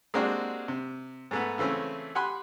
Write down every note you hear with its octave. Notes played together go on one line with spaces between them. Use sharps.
G#3 A#3 C4 D4 F#4 G4
C3
G#2 A3 B3
C#3 E3 A3 C4 C#4
G4 F#5 G#5 B5 C6 F#6